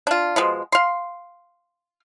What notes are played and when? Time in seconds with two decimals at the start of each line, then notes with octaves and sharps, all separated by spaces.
0.07 D4 F4
0.36 B2 F3 G#3
0.72 F5 C6